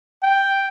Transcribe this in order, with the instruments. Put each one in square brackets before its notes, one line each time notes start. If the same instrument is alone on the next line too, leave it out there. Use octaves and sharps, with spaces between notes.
[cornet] G5